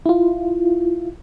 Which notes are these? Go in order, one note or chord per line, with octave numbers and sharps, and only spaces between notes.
E4 F4